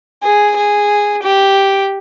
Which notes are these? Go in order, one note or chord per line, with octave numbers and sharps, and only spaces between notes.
G#4
G#4
G4